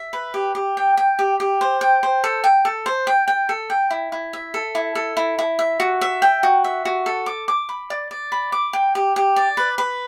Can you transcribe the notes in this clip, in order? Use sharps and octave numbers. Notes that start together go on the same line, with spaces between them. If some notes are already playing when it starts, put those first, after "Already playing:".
Already playing: E5
B4
G4
G4
G5
G5
G4
G4
C5
G5
C5
A4
G5
A4
C5
G5
G5
A4
G5
E4
E4
E5
A4
E4
A4
E4
E4
E5
F#4
E5
G5
F#4
E5
F#4
A4
D6
D6
B5
D5
D5
B5
D6
G5
G4
G4
D5
B4
B4